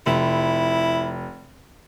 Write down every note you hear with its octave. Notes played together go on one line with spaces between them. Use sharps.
F1 E4